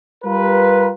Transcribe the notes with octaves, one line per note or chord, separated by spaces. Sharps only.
G3 F4 G4 A#4 B4